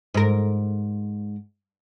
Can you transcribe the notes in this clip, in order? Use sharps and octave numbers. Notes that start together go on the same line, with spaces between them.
G#2 A#4